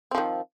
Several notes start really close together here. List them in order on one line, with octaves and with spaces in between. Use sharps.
C4 F3 D#3